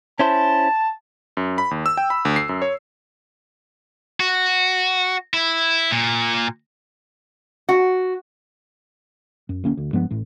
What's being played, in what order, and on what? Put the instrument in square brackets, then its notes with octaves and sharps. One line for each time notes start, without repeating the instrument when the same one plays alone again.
[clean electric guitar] C#4 E4 C5 [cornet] A5
[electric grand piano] F#2
B5
D#2
E6
G5
B5
D2
C7
F#2
C#5
[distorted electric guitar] F#4
E4
A#2
[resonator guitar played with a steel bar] F#4
[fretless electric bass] F#2
D2 A#3 C#4
D2
G2 F3 G#3 B3
A1 A2